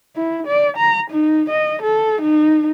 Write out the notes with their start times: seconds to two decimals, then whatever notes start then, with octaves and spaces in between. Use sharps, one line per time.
0.16 E4
0.47 D5
0.77 A#5
1.11 D#4
1.50 D#5
1.82 A4
2.22 D#4